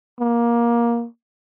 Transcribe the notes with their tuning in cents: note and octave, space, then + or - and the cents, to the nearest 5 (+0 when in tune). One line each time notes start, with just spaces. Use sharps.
A#3 +15